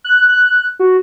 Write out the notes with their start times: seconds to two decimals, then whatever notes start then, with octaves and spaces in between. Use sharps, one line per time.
0.04 F#6
0.29 F#6
0.79 F#4